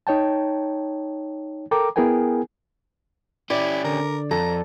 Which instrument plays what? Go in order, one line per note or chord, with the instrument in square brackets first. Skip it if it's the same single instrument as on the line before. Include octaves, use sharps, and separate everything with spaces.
[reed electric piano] D#4 C#5 G5 A5
A4 A#4 G5 A#5 D6
B3 E4 G#4 A#4 G5 G#5
[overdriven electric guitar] C#4 G4 [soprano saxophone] E4 [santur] D5
[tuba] D3 [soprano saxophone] A#4
[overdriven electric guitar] F2 [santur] A4 [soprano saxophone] A#5